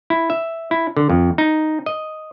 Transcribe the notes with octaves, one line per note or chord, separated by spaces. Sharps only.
E4
E5
E4
D3
F2
D#4
D#5